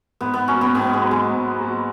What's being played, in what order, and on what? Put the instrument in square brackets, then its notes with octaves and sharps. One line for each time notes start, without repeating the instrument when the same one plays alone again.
[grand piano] G#2 [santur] B3
[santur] B3
[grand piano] F#3 A#3 [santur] C#4
[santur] B3
[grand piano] G#2 [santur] B3
[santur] G#3
[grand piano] F#3 A#3
[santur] G#3
[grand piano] G#2
F#3 A#3